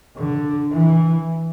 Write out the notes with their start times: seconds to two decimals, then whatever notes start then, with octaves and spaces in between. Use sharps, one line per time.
0.17 D3
0.71 E3